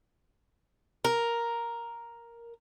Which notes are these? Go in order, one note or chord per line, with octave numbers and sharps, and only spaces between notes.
A#4